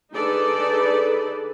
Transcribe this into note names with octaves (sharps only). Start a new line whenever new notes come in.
D3 D#4 G#4 A4 B4 D5